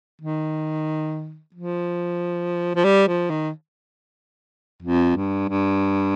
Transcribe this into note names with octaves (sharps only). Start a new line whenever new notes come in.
D#3
F3
F3
G3
F3
D#3
F2
G2
G2